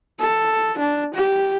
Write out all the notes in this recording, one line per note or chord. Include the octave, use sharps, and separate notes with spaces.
A4
D4
G4